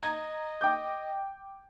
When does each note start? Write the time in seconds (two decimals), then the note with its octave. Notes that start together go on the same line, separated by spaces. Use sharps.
0.03 D#5 A#5 G#6
0.61 G5 D6 G6